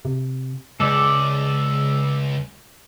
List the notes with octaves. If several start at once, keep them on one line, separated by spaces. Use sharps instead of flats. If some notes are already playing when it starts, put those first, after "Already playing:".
C3
C#2 G#3 A4 D5